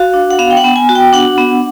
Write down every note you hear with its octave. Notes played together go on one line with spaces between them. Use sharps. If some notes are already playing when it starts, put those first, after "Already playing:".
Already playing: F#4 F5
D4
F#5
B3 F5
G5
F#5
B3
G#5
F#4
G5
D4 F#5
B3